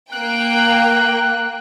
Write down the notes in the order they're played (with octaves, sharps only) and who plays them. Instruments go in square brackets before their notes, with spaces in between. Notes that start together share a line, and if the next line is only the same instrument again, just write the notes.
[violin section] A#3 G5 [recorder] F#6